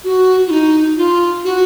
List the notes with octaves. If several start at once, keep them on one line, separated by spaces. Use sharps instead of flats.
F#4
F4
D#4
F4
F#4